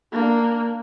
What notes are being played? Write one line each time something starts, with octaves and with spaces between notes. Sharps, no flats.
A#3 D4